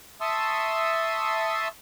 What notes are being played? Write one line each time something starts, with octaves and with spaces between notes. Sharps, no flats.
E5 A5 C6 C#6 D#6 E6